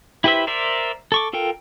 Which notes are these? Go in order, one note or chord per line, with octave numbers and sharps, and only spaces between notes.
E4 G4 B4 C5 E5
A#4 C5 D5 E5
A4 C#6 D6
F4 A4 A#4 G5